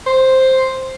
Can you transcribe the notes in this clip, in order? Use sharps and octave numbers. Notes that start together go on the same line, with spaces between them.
C5